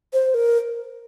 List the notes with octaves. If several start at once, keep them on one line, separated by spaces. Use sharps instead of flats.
C5
A#4